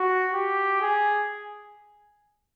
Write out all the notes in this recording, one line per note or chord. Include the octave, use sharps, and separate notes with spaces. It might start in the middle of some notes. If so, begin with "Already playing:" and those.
Already playing: F#4
G4
G#4